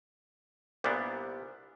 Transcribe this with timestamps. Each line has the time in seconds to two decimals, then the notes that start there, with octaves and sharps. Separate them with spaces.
0.84 C2 A#2 G3 B3 D4